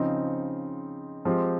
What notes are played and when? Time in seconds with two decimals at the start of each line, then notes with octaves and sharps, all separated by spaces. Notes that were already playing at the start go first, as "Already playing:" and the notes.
Already playing: C#3 F3 C4 D#4
1.25 F3 G#3 C4 G4